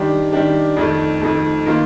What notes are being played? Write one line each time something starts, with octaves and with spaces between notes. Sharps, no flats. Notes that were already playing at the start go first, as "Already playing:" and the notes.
Already playing: D#3 G3 D4 G4
D#3 G3 D4 G4
F2 D#3 A3
F2 D#3 A3
D#3 A#3 F4